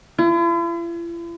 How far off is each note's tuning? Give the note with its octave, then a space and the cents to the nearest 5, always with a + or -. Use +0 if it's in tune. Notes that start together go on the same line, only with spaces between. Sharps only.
E4 +45